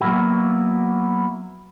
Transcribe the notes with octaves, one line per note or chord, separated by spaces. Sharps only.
F#3 A#3 B3 E4 F#4